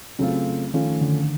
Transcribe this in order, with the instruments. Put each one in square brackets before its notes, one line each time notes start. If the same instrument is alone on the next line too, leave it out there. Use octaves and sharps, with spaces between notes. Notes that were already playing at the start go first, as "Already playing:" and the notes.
[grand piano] C#3 F#3 A3 C4 F4
[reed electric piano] D#3 [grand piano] F3 A3 C#4
[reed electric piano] D3